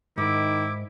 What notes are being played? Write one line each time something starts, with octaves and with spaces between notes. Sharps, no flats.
G#2 D#3 E4 D6